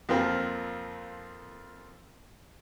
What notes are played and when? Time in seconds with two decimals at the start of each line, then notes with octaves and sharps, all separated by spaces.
0.09 F2 F3 A#3 C4